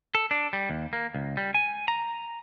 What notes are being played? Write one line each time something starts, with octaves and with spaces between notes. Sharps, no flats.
A4
D4
G3
D#2
A#3
C#2
G3
G#5
A#5